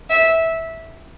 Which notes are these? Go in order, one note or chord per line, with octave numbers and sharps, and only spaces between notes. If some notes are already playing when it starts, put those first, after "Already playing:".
E5